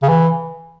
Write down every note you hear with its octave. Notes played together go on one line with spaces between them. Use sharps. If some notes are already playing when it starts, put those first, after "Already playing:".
C#3
E3